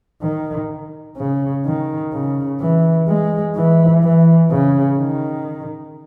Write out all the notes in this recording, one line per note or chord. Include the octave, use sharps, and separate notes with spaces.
D#3
C#3
D#3
C#3
E3
G#3
E3
E3
C#3
D#3